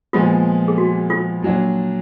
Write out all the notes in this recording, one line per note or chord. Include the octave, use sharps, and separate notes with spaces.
A#2 F3 G#3 B3 F4
G#4
F#4
F4
A#2 F#3 D4